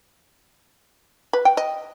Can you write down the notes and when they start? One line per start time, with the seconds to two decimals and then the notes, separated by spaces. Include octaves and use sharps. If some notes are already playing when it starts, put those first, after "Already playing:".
1.33 B4
1.45 G5
1.57 D#5